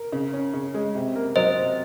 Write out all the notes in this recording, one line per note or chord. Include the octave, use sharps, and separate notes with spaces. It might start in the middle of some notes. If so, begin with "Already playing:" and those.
Already playing: A#4
C#3
C#4
C#3
G#3
C3
A#3
F#3 C5 D#5
C3